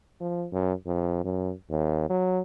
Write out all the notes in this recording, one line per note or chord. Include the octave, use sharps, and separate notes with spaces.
F3
F#2
F2
F#2
D#2
F#3